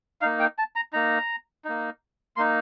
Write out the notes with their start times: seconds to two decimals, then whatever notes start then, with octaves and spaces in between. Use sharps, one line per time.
0.21 A#3 D#4 F5
0.40 G5
0.58 A5
0.76 A#5
0.93 A#3 D#4 A#5
1.65 A#3 D#4
2.37 A#3 D#4 C6